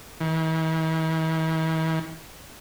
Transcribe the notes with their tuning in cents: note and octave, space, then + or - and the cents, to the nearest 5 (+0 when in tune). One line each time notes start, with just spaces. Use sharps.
E3 -45